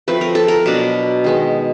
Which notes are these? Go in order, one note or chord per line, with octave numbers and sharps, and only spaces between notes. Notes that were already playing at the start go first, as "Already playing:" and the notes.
F3 A3 C4 B4
A#4
A4
A#4
B2 F#3 B3 D4
D#3 G#3 B3